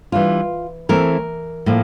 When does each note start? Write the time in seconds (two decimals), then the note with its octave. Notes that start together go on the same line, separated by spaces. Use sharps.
0.12 E3 G3 D4 F4
0.89 E3 A3 C4 A#4
1.66 A2 F3 A#3